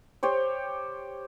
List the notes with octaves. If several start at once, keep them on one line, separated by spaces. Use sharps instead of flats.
G4 C5 C#5